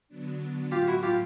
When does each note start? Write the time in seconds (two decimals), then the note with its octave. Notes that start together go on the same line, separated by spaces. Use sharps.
0.08 D3 F#3 B3 D4
0.72 A2 F#3 A#3 F4 G4
0.88 E4 F#4
1.03 F4 G4